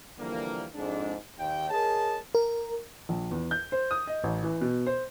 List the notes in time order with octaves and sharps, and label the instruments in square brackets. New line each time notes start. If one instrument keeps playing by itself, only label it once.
[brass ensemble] D3 E3 F3 G3 A#3
F2 G#2 G#3 D4
D#2 G5
G#4 A#4 C#5 D#5 A5
[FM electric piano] A#4
[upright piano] A#1
E2
G6
C5
D#6
D#5
A1
E3
B2
C5